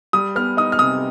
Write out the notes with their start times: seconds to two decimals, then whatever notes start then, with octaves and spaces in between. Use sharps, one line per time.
0.13 G3 D#6
0.36 B3 F6
0.57 D#4 D#6
0.72 F6
0.79 C3 D#6